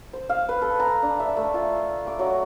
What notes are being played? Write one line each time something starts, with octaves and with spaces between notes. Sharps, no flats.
C5
F5
B4
A4
A#5
D4
E5
A3
F4
D6
F#3